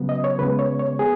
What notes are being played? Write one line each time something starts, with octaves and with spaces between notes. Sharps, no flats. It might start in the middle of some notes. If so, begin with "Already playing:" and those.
Already playing: C#3 F#3 B3
D#5
C#5
C#3 G#3 B3 B4
C#5
C#5
B3 G#4